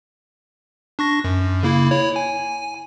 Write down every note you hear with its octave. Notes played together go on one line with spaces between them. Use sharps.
D4 C#6 A#6
F#2
C#3 A#3 E4
E4 C#5
G#5